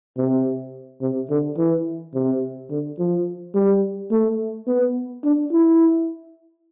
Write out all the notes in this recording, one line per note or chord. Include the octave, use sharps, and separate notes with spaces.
C3
C3
D3
E3
C3
D3
F3
G3
A3
B3
D4
E4